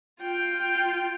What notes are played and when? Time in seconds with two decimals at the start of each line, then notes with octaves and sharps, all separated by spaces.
0.20 F4 G5